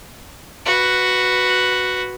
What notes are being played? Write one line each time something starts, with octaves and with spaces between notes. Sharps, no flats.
F#4 B4